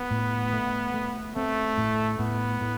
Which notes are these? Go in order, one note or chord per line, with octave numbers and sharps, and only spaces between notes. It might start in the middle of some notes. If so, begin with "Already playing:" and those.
Already playing: B3
A2
A3
A3
A3 C4
A2
A2 B3
A2